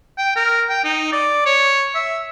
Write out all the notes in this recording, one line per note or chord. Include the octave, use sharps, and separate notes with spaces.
G5
A#4
G5
D#4
D5
C#5
E5